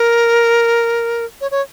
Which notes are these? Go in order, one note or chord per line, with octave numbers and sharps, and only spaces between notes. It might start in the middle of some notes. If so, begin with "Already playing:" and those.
Already playing: A#4
C#5
C#5